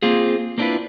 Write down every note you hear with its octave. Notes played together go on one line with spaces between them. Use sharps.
A#3 C4 F4 G#4
A#3 C4 D4 E4 F4 B4